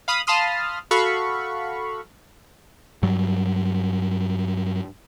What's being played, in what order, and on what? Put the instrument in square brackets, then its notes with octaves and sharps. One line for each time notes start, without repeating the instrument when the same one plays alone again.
[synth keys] F5 B5 D#6
F5 A5 B5 C6 D#6 F6
F#4 A4 F5 B5 C#6
[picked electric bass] G2 F#3 G3